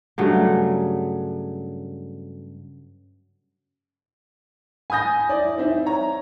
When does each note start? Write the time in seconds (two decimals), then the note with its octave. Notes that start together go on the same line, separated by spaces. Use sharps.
0.18 G2 C#3 F#3 A3
4.90 G#5 B5 D#6 G6 A#6
5.29 E4 D5
5.58 C4 D#4 E5
5.86 C#5 A#5